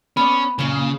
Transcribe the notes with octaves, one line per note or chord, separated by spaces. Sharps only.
B3 C#4 D5 B5
F#2 A#2 C#3
C7